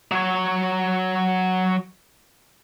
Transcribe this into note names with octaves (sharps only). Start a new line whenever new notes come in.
F#3 C#5